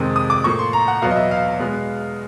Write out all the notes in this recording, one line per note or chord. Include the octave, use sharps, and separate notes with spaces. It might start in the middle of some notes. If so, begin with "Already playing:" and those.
Already playing: F2 C3 D#3 G#3 C4 D#6
D#6
D6
A2 F3 A#3 C#6
C6
A#5
F#5
E2 B2 F#3 B3 F5
D#5
E5
F5
B2 G#3 B3